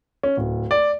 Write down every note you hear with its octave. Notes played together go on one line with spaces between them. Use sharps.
C#4
D1
D5